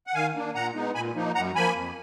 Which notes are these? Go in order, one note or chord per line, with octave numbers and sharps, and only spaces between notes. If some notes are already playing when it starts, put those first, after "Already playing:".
F#5
D#3 F5 G#5
A#3 D4
A#2 F#5 A#5
G#3 B3 D#4
A#2 G#5 B5
F3 A#3 D#4
F#2 F#5 A#5
F3 A#3 G#5 B5
F2